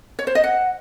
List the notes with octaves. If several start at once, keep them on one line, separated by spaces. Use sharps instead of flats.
C#5
C5
D#5
F#5